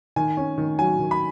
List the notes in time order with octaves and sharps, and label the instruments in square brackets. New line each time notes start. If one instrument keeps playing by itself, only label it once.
[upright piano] D#3 [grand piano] G#5
[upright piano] C#4
D#3
[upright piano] F#3 [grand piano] G#5
[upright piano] D#3
[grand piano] B5